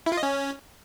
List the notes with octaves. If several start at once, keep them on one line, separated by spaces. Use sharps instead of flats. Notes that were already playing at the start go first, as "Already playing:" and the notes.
E4
F4
D#5
C#4